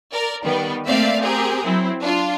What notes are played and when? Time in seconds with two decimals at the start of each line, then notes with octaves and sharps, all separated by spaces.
0.13 A#4 D5
0.43 D#3 G3 B3
0.87 A3 A#3 C4 D5 E5 F5
1.21 C4 G4 G#4 A#4
1.64 F#3 C4 E4
2.00 D4 F4